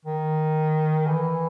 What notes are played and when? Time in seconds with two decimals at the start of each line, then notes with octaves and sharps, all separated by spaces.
0.05 D#3
1.07 E3